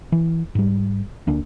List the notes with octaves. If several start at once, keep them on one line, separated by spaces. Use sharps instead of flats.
E3
G#2 G3
D2 D3 A#3 D4